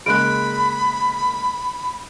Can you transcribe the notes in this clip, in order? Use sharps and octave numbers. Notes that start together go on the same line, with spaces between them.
C#3 G#3 A#3 B5 F#6 D7